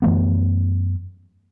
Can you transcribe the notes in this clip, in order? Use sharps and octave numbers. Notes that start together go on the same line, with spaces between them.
F#2 E3 A3 B3